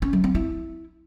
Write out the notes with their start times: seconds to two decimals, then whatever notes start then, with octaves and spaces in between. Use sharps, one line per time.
0.02 C#4
0.13 F#3
0.24 C4
0.35 E4